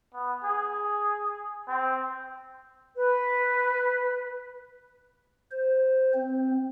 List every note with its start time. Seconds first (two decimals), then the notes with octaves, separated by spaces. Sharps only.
0.14 B3
0.44 G#4
1.68 C4
2.96 B4
5.51 C5
6.14 C4